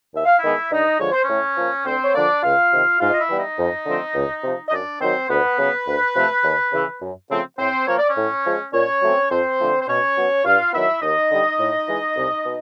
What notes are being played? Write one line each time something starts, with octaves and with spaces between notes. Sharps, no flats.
D#2 E5
F5
E4 E5
D#3 G#3 B3
G2 D#4 D#5
D3 F3 G#3 C#5
C5
A2 C#4 C#5
F3 A#3
D2 C4 C5
C#5
D3 F3 A#3 D4 D5
C#2 F4 F5
C3 D#3
G#2 F4 F5
D#5
E4 E5
E3 G3 B3
D#4 D#5
F2
D3 F3 A3 C4
C#2
C3 F3
D#5
F#2 D4 D5
D#3 F#3 C4 C5
D2 B3 B4
C#3 F#3 B3
D2
C3 F3 A3
D#2
C#3 E3
F#2
C#3 F3 A3 C4
A2 C4 C5
F3 A#3 C#5
D5
C#4 C#5
A2
F3 G#3
A#2 C#4 C#5
F#3 A3 C4
F2 C4 C5
D3 F3 A3
C5
B2 C#4 C#5
F#3 B3
G2 F4 F5
D#3 F#3 B3 E4 E5
D#2 D#4 D#5
D3 G3
A2
E3 G#3
C2
B2